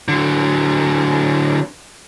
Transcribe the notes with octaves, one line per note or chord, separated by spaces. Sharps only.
D3 F#3